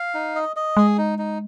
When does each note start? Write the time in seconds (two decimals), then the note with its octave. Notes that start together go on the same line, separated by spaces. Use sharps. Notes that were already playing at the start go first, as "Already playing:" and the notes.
Already playing: F5
0.14 D#4
0.36 D#5
0.56 D#5
0.77 G#3 G#4
0.98 D#4
1.19 D#4